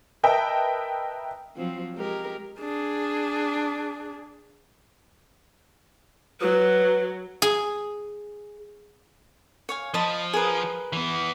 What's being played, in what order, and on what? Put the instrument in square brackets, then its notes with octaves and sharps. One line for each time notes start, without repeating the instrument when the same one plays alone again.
[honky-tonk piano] A#4 B4 D#5 E5 G5 A5
[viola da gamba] F3 F#3 C4
G#3 G4 A#4
[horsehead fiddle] D4 G#4
[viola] F#3 [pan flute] B4
[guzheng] G#4
[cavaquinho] C#5 F5 G#5
[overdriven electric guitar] F3 [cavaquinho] D#5 A5 B5
[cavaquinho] G#4 A#4 B4
[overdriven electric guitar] E3 B3